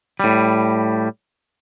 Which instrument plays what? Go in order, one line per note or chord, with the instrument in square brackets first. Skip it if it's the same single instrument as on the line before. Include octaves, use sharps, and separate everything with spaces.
[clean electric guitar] A2 G3